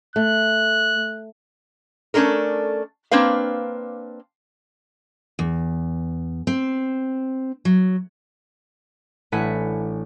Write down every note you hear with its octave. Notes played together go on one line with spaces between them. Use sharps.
A3 F#6
A3 C#4 D4 A4 A#4
A#3 C4 D4 B4 F5
E2
C4
F#3
A1 A3 D4 F#5 G#5 B6